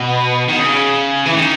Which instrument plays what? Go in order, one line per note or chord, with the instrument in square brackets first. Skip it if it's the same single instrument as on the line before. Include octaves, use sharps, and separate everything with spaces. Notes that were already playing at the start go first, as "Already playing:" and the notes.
Already playing: [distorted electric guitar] B2
D#3
C#3
E3
D#3